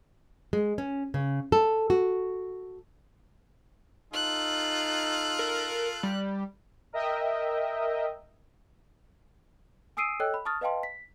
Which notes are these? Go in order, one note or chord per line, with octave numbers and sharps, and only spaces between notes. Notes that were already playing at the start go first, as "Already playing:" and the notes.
G#3
C#4
C#3
A4
F#4
D#4 F4 A4 F#6
A#4
G3
A#4 D#5 E5 G5
G#5 D#6 E6 C7 D7 D#7
A4 C#5 D#5 G5 E6 F#6
B5
A5 C#6 D#6 F6 A6
B4 D#5 F5 G5 A5 C6
B6